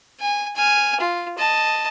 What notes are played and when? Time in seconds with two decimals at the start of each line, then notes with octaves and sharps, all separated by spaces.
0.20 G#5
0.56 G#5 F6
1.00 F4
1.38 D#5 A5